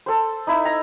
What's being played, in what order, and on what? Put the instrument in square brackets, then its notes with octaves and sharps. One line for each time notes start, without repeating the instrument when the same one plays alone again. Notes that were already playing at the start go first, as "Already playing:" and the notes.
[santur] A4 C5
D#4 E4
A#5